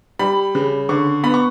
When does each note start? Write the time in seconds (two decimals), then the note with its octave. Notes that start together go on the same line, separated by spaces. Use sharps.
0.19 G3 B5
0.55 C#3
0.89 D3 C#6
1.23 B3 B5
1.34 C#6